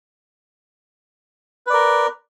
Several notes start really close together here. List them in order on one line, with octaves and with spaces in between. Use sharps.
B4 D5 A#4